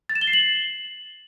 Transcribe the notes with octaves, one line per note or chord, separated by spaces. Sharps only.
A6
E7
G7
C7
F#7